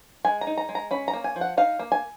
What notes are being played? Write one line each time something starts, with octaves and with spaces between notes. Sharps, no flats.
G#3 G#5
A#5
D#4
A#5
G#3
A#5
C#4 B5
A#5
A#3
G#5
F3
F#5
D#4 F5
A#3
G#5